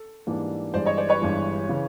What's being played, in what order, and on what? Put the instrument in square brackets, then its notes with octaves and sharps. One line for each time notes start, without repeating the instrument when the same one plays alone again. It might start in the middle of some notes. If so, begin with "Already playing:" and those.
Already playing: [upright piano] A4
[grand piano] G#2 E3 G3 A#3 D4
[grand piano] G1 G2 E3 G#3 [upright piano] C5 D5
[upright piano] C#5 D#5
C5 D5
B4 C#5
[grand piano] G1 G2 E3 G#3
C#3 E3